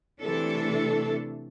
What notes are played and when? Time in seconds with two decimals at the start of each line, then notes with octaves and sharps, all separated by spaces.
0.21 C3 E3 A3 D4 A4